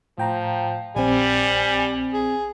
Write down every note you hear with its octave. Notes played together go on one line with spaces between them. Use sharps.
A2 F3 G5 A#5
A#1 G3 C4 G#5
G#4